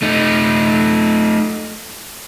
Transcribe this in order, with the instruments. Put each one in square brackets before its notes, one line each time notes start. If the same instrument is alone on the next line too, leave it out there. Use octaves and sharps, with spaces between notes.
[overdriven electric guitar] A3 D#4